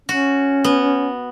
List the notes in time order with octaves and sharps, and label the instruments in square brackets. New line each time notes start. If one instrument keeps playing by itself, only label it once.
[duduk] C#4 [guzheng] F#4
[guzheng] B3